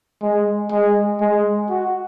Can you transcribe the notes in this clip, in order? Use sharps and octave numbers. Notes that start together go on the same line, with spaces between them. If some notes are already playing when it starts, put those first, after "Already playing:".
G#3
G#3
G#3
F#4